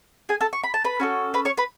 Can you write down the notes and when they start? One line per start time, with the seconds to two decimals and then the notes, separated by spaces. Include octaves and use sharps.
0.29 G#4 G#5
0.41 A4 A5
0.53 C#6
0.63 B5
0.74 A5
0.84 B4 B5
1.00 C#4 F#4 A4
1.34 B4 B5
1.45 C#5 C#6
1.57 B4 B5